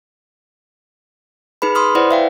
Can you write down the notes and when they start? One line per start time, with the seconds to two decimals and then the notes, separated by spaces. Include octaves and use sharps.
1.62 D#4 G#4 B4 B5
1.75 B5 C6 D#6 F6
1.95 E4 B4 C5 D5 F#5
2.11 E5 F5 G5